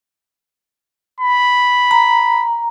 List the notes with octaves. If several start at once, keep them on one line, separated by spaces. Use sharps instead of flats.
B5
A#5